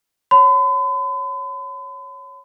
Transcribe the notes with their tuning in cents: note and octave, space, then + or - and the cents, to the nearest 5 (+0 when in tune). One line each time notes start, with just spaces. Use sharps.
C#5 +0 B5 +45